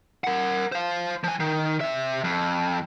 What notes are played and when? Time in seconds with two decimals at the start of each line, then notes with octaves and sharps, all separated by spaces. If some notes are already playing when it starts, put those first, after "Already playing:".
0.24 A#4 F#5
0.72 C5 F5
1.24 F3 G#5
1.40 D#3
1.81 C3 E5
2.24 F2